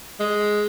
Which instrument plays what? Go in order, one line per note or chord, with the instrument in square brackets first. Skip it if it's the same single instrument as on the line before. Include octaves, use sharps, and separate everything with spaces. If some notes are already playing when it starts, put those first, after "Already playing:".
[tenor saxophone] G#3